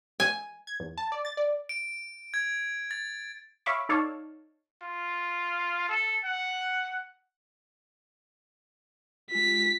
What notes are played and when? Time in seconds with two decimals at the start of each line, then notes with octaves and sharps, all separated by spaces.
0.20 G#5
0.67 G#6
0.80 E2
0.98 A5
1.12 D5
1.25 A6
1.37 D5
1.69 D7
2.34 G#6
2.91 A6
3.66 C#5 E5 F5 B5 C#6 D6
3.89 D#4 A4 C#5 D5 F5 A5
4.82 F4
5.89 A4
6.24 F#5
9.31 G#3 F4 B6